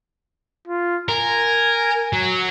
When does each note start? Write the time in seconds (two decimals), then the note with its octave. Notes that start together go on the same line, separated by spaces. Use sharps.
0.68 F4
1.09 A#4 G#5
2.13 F#3